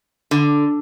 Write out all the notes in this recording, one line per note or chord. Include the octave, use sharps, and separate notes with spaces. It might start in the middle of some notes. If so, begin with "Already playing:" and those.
D3